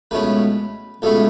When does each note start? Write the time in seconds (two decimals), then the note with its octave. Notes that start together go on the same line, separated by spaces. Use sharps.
0.11 C#2 B2 A3 C#4 E4 B4
1.02 C#2 B2 A3 C#4 E4 A4